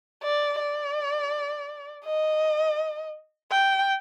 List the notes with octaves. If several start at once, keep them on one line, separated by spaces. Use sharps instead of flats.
D5
D5
D#5
G5